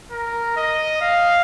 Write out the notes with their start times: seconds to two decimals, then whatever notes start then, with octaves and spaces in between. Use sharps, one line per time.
0.12 A#4
0.57 D#5
1.02 F5